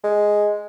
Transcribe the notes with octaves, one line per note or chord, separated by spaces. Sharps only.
G#3